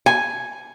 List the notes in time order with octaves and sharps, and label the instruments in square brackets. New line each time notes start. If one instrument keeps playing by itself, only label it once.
[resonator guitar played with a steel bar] G#5